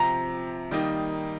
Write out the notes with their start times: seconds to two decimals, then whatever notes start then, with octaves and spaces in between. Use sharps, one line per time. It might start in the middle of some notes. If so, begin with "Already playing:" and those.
Already playing: C3 F3 C4 A#5
0.71 D#3 G3 A#3 D#4